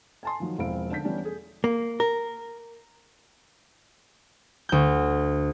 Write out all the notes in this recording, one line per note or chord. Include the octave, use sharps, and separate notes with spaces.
G#5 A5 C6
D#3 F3 F#3
E1 F3 C4 E4 F5 D7
D3 D4 G6 B6
E3 G3 B3 C#4 D4
G#4
A#3
A#4
D2 G6